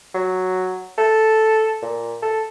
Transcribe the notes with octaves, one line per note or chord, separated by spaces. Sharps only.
F#3
A4
A#2
A4